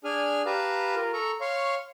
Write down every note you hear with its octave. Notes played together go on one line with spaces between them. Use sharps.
D4 G#4 G#5 F6
G4 B4 F5 A5 A#5
F4 A#4
A4 A#5 C#6
C#5 F5 C6 C#6